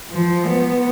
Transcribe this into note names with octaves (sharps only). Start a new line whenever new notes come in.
F3
B3